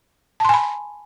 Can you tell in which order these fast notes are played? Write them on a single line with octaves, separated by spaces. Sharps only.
A5 C6 G#5 B5